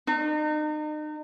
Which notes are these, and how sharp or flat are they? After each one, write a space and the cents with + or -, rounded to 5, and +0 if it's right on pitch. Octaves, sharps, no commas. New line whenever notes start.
D#4 -35